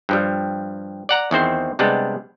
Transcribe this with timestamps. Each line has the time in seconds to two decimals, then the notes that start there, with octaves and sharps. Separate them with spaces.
0.09 G2 F3 G3
1.09 D5 F#5 A#5
1.31 E2 D#3 C4 C5
1.79 C3 G3 G#3 B3 D4